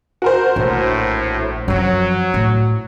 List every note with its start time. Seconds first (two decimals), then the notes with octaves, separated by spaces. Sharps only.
0.22 F#4 A#4 C5
0.56 A#1 A2
1.68 F#2 F3 F#3
2.34 A2